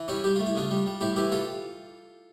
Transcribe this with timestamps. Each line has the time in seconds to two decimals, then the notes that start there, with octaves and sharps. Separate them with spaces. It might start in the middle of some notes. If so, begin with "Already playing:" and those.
Already playing: E3
0.08 G3 C#4 E4
0.24 G3 G4
0.36 A3 F4
0.46 E4
0.55 C#3 D4 F4
0.71 G3
0.86 G3
1.01 A2 E4 G4
1.16 E3 E4 G4
1.32 G3 F4 A4